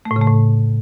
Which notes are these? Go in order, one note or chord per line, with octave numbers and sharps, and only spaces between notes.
A3
A2
C#3
A3
A2